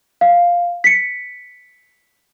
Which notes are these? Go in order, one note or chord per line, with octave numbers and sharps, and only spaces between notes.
F5
B6 C#7